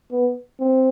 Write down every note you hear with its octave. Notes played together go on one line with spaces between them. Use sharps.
B3
C4